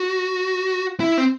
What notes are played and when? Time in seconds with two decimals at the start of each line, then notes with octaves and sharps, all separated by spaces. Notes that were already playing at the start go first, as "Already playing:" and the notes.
Already playing: F#4
1.00 E4
1.18 C4